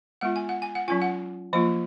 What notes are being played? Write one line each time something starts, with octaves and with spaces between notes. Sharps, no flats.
G#3 B3 F4 F#5
G#5
F#5
G#5
F#5
F#3 C#4 F4 G#5
F#5
F3 A#3 F4 D#5